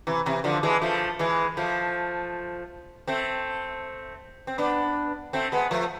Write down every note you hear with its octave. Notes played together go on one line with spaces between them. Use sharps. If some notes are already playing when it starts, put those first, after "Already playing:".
C3 E3
C3 E3
D3 F3
E3 G#3
F3 A3
E3 G#3
F3 A3
A3 C4
C4
B3 D4
A3 C4
G#3 B3
F3 A3